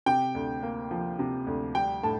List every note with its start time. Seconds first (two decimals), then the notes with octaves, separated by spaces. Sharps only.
0.06 C3 G5
0.35 D2
0.63 A#3
0.91 F3
1.19 C3
1.47 D2
1.75 G3 G5
2.03 A2 A5